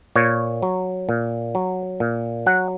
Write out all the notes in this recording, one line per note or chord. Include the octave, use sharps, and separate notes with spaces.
A#2 C#5
F#3
A#2
F#3
A#2
F#3 F#5